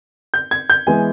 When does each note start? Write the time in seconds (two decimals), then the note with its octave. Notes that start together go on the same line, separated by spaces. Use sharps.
0.34 G6
0.51 G#6
0.70 G6
0.87 E3 G#3 B3 G#5